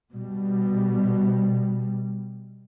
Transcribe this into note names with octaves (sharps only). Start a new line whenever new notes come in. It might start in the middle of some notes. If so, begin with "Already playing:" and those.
B2 G3